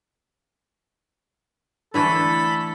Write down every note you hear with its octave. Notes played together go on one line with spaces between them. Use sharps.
D3 E3 A3 A4 B5